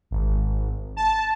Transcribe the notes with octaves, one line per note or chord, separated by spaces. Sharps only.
G#1
A5